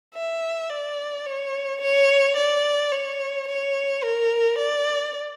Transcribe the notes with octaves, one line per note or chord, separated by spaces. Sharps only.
E5
D5
C#5
C#5
D5
C#5
C#5
A#4
D5